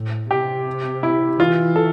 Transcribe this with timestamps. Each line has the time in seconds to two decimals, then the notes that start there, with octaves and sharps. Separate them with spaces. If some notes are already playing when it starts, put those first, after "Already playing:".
Already playing: A2
0.30 C3 G4
1.03 E4
1.39 E3 F4
1.76 A4